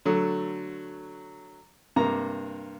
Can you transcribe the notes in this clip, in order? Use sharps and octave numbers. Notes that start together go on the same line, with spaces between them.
D3 F#3 A3
G2 C3 A#3 A#5